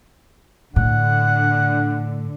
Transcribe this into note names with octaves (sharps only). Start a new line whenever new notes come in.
A2 D3 F#5